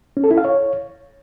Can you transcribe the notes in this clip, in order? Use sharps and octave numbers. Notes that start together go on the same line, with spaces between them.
C#4
A4
E4
F5
C#5